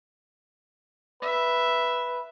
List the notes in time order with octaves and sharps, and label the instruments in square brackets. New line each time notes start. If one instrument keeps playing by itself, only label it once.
[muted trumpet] B4 [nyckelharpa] E5